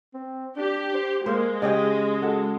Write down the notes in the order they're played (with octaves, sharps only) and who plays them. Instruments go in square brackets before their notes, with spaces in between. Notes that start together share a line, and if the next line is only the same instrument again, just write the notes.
[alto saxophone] C4
[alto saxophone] D4 [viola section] G4
[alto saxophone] C5
[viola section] G#3 [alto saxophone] A#3 [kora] C5
[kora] C#3 C#4 G4 [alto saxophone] D#5
[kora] F#4 [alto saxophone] A4